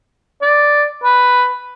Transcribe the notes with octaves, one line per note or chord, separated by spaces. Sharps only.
D5
B4